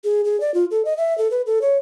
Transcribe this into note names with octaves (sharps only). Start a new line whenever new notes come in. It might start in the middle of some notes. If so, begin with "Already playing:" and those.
G#4
G#4
D5
F4
A4
D#5
E5
A4
B4
A4
C#5